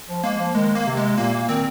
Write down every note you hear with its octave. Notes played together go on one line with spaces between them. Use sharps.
F3
G#3 A#3
F3
D#3 G#3
A#3
C3
G#3
A#2 A#3
A#2
D#3 C4